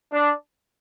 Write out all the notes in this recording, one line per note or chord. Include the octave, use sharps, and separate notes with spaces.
D4